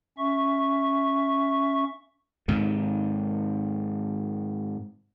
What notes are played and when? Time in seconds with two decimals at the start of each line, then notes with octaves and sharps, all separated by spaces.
0.18 C#4 E5 C#6
2.48 G#2 C3 D#3